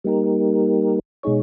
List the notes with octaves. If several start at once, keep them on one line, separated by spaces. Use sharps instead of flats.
G3 A#3 D#4 G4 A#4
B2 G#3 D#4 G#4 C#5